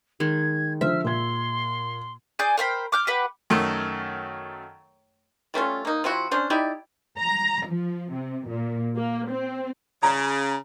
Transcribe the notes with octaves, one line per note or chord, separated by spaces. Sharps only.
D#3 G#3 G#6
D3 F3 C5 E5 F6
A#2 C6 G#6
G#4 D5 G#5 G6
A#4 C5 G5 B5
D6 F6 G6
G4 B4 F#5
F#2 D#3 A3
G3 A3 C#4 F4
A#3 D#4
F3 C4 E4 F#4
C#4 D4 C5
D#4 E4 G4 D5
A#5
F3
C3
A#2
A#3
C4
C#3 A#5